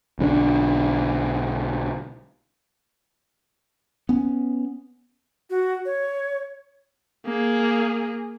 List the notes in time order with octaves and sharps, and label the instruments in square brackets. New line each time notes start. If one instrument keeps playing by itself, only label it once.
[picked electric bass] B1 D3 G3 D4
[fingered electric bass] B3 C#4
[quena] F#4
C#5
[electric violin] A#3 G#4